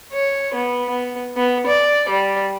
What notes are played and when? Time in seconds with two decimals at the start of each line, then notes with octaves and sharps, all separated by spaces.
0.13 C#5
0.54 B3
0.90 B3
1.35 B3
1.66 D5
2.09 G3